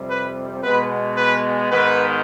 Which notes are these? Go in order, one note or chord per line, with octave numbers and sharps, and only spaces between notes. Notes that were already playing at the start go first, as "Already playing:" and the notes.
Already playing: F2 C3 G3
B4
B2 G#3 B3 B4
B4
G#2 D#3 B3 B4